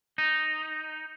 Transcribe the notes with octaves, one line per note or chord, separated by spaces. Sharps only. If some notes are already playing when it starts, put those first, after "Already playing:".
D#4